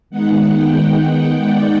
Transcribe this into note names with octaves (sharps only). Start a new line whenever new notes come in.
D#3 G#3 B3 D#4 F#5
G5
F#5
D5